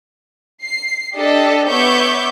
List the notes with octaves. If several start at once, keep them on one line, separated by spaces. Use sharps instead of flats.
C7
D4 G4 A4 D#5
B3 C#5 E5 C#6 D6 G6